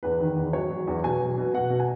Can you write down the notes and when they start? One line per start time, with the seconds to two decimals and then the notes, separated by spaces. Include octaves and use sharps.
0.03 E2 B4
0.20 D#3
0.36 E2
0.53 F#3 C#5
0.70 F#3
0.87 E2
1.03 B2 G#5
1.20 F#3
1.38 B2
1.54 B2 F#5
1.70 B2
1.80 G#5